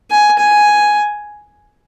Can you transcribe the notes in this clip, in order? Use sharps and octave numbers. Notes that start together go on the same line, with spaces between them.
G#5
G#5